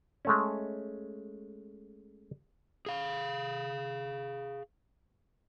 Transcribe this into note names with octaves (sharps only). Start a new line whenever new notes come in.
G#3 A3 C#4
G#4 F5